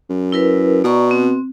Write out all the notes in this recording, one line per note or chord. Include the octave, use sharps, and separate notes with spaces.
F#2
E4 A#4 B4
B2 D5 A#5 C#6
C4